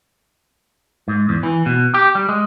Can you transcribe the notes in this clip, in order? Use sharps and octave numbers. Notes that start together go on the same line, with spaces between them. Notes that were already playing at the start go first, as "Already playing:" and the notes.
G#2
E2
E3
B2
G4
G3
G#3